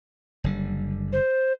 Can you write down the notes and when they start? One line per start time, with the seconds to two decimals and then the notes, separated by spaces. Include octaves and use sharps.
0.44 F#1 D3 G3
1.13 C5